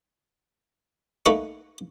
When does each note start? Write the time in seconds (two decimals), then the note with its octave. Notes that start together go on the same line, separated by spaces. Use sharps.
1.26 A3 A#3 D#4 B4 F#5 C#6